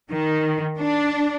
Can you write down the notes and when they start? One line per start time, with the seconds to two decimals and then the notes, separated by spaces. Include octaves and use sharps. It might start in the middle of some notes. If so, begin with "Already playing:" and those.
0.11 D#3
0.78 D4